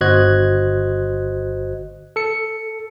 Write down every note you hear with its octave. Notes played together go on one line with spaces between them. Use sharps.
G1 F#4 C5 D#5 F#6 G#6
A4 C#7